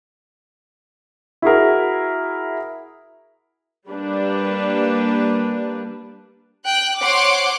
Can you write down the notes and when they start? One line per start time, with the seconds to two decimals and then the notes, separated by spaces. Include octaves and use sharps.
1.42 E4 F#4 G#4 A#4
3.87 G3 A#3 D4 B4
6.65 G5 F#6
7.00 C5 C#5 F#5 C6 D6